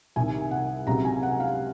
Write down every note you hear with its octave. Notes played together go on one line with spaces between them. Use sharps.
C2 C3 D#3 G#5
F#5
C#2 C3 F#3 C4 D#4 A#5
G#5
F#5
F5